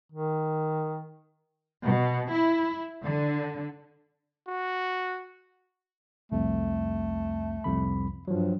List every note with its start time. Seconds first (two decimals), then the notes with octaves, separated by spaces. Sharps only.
0.12 D#3
1.85 B2
2.31 E4
3.03 D3
4.49 F#4
6.32 C2 F2 A3
7.64 C2 F2 B5
8.28 G2 F3 F#3